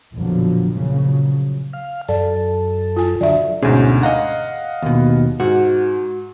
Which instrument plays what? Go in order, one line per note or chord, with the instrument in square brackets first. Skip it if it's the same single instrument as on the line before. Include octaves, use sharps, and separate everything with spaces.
[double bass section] A#1 F2 B2 D3 F3 F#3
A#2 C#3 F3 F#3 A#3
[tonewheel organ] F5
[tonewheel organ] F#2 A4 [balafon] D5
[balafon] F4 G#5
[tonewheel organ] D3 F#3 [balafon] D5 E5
[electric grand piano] D2 G#2 [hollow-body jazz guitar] B2 C#4 G#4
[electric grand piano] D#5 F5 F#5 [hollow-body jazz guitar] A#5
[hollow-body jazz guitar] D#2 B2
[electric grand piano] G#2 [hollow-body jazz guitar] F#4